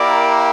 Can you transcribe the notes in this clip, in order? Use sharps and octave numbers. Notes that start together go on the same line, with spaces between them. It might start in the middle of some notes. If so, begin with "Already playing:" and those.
Already playing: A#3 E4 G4 A#4 D5